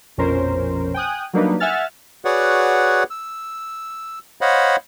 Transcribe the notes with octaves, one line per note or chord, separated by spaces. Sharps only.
A#1 F2 B2 C#4 A#4 C5
G5 G#5 D#6 F#6
F#3 G3 A#3 D4 D#4 B4
E5 F#5 G#5 F6 A6
F#4 G#4 B4 C#5 D5 F#5
E6
C5 C#5 D#5 F5 F#5 B5